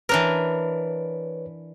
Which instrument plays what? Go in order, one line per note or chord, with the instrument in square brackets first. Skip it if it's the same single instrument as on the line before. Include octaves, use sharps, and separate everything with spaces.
[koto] E3 D4 A#4 [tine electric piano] B4 C#5